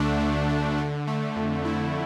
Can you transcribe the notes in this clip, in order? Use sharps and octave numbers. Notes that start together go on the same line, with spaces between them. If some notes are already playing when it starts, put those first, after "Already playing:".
Already playing: D2 D3 A3 D4
D3
A3
D3
A3
F2
E4